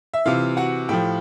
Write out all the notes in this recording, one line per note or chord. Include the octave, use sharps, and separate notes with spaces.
E5
C3 E3 F4 F5
F#4 F#5
A2 F3 G4 G5